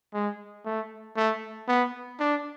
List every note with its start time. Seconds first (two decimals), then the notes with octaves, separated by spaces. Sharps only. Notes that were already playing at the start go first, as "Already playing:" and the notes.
0.14 G#3
0.65 A3
1.17 A3
1.68 B3
2.20 D4